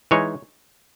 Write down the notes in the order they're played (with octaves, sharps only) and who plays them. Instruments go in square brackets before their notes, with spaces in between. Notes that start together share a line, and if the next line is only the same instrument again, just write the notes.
[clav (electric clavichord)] E3 G#3 D#4 C#5